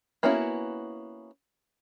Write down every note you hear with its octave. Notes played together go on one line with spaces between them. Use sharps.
A#3 B3 C#4 E4 F#4